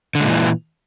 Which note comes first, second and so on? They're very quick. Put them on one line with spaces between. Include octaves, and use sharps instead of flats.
D3 G#3 A#2 E3